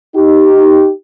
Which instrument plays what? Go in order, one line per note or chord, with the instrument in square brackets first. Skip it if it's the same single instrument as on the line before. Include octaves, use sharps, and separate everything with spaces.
[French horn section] D#4 G4